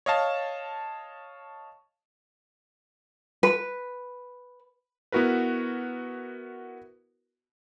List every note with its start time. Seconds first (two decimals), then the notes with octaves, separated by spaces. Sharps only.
0.06 C#5 D#5 F5 A5
3.43 B4
5.12 B3 E4 F#4 A#4 B4